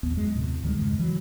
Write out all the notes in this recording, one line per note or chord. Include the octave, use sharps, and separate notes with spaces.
A1 D#2 B3
F#2 G#3
D#2 A2 C3
D2 D#3 G3 G#3
F2 G#2 C#3 G#3
E3 F#3